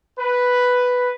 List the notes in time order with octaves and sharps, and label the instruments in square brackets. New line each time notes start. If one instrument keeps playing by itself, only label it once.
[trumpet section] B4